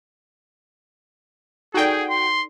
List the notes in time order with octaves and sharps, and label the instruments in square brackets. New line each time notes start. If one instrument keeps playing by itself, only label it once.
[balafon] D#4 A4 D5 [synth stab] F#4 G5 [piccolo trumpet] G#4
[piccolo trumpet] C6